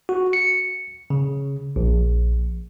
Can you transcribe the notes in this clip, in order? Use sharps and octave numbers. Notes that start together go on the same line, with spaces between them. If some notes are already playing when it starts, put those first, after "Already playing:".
F#4
C#7
C#3
A#1